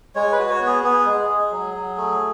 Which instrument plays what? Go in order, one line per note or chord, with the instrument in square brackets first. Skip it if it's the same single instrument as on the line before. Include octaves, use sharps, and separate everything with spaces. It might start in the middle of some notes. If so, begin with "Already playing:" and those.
[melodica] G#3 C#5
B4
F#4
C#5
B3
G#4
B3 G#4
G#3
G#3
F#3
F#3
A3